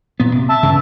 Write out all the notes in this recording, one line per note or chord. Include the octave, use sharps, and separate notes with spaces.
A#2 B3
C3
E5 A5
G2 C#3